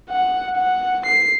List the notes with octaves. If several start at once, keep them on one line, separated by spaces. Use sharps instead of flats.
F#5
F#5
C7